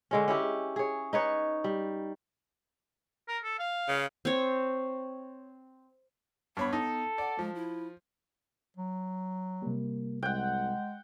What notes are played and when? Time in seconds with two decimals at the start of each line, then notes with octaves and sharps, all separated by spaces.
0.11 D3 G#3 C#4
0.28 C#4 E4 G4
0.76 G#4 C#5
1.13 D#4 B4 C#5
1.64 G3
3.29 A#4
3.44 A4
3.59 F5
3.88 C#3
4.25 C4 C#5
6.57 G2 B3 C#5 B5
6.73 D#4 A4
7.18 D5 F#5
7.39 F3 G#3
7.55 E4
8.77 F#3
9.62 C3 G3 A#3
10.23 C2 G#3 F#5 G5